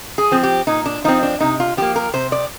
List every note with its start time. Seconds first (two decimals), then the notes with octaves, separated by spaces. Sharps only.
0.18 G#4
0.31 F3 C4
0.43 G4
0.67 A#2 D#4
0.86 D4
1.04 F3 C4 D#4
1.23 D4
1.41 C3 D#4
1.60 F4
1.77 F3 A#3 G4
1.96 A#4
2.13 C3 C5
2.32 D5